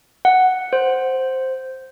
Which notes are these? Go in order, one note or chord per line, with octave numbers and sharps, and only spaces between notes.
F#5
C5